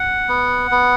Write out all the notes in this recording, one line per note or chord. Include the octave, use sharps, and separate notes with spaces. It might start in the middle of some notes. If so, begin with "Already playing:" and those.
Already playing: F#5
B3
B3